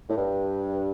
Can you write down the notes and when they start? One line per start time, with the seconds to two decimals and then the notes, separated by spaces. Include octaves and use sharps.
0.09 A2
0.16 G2